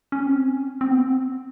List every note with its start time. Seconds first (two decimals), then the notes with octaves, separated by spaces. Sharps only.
0.12 C#4
0.26 C4
0.81 C4
0.91 B3
0.98 C4